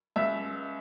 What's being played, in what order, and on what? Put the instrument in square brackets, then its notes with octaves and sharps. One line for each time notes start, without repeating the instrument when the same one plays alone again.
[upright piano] C#2 E5